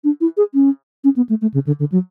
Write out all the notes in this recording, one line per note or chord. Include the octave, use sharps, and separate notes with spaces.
D4
E4
G#4
C#4
C#4
B3
A3
A3
C#3
D3
D3
F#3